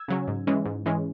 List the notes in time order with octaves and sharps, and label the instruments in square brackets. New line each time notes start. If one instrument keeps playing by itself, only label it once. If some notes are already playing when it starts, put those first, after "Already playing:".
Already playing: [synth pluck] E6 G#6
C#3 F#3 C#4
G#2
E3 G#3 C#4
G#2
E3 G#3 C#4